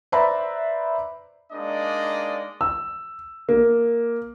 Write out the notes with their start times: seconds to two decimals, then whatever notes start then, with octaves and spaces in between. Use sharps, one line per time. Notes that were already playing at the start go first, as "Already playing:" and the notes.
0.12 B4 C5 D5 E5 A#5 B5
1.53 G#3 A#3 D4 D#4 D5 D#5
2.61 E6
3.49 A#3